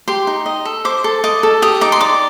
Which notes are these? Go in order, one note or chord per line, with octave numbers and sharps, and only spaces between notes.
G4 C6
D#4
D#5
A4
C5 D6
A4
D#5 D6
A4
G4 D#6
D#4 D6
C6
D5 D6